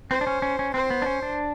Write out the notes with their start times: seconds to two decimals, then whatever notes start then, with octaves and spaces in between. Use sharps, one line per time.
0.11 C4 C5
0.21 D4
0.27 C#4
0.42 C#4
0.59 C#4
0.74 C4 C5
0.91 B3
1.02 D4
1.06 C#4
1.22 D4